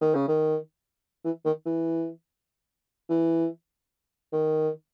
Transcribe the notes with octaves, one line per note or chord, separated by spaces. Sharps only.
D#3
C#3
D#3
E3
D#3
E3
E3
D#3